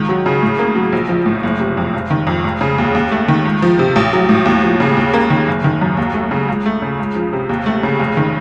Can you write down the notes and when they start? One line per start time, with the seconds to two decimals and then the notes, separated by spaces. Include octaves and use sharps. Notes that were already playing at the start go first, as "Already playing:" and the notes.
Already playing: C#2 D#3
0.09 F#3
0.26 C#3
0.42 A2
0.59 A#3
0.76 F#3
0.92 A#1
1.09 F3
1.26 A2
1.43 F#1
1.60 C3
1.77 F2
1.94 F1
2.10 D#3
2.27 F2
2.44 F1
2.61 C#3
2.78 D#2
2.95 D#2
3.11 A3
3.28 D#3
3.45 C#2
3.62 F3
3.79 C3
3.96 A1
4.13 F#3
4.29 A2
4.46 D#2
4.63 F3
4.80 C#3
4.97 D#2
5.13 A#3
5.30 D#3
5.47 F#1
5.64 D#3
5.81 F#2
5.97 D#2
6.14 A3
6.31 C#3
6.48 C#2
6.66 A3
6.82 C#3
6.99 C#2
7.15 F3
7.33 C3
7.49 D#2
7.66 A3
7.83 C#3
8.00 F1
8.17 D#3